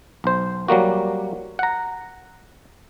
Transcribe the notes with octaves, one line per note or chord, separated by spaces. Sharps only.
B1 C5
F#3 G3 A#3 F#4
F#5 A#5